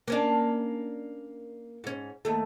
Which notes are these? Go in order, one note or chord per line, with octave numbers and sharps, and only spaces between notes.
A#3 C#4 D4
G#2 C#4
D#2 A3